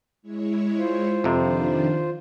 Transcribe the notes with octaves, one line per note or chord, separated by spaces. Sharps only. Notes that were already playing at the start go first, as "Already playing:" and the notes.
G#3 E4 C#5
F4 C5
F2 C3 D#3 F3 D4